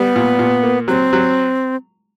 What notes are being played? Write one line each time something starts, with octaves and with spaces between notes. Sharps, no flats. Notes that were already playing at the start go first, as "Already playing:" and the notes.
Already playing: G3 B3
A#2
A#2
A#3
F#3 C4
F#3